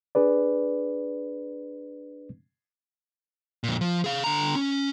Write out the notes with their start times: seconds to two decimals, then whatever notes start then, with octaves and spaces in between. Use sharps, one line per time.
0.15 D4 G#4 B4 D5
3.64 F2 A#2
3.81 F3
4.04 G#4 F5
4.24 D3 A#5
4.55 C#4